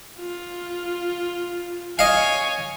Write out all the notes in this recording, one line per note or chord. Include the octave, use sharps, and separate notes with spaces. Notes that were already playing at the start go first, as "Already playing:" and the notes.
F4
C#5 D#5 F5 G#5